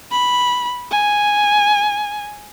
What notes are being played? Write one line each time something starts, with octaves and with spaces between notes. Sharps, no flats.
B5
G#5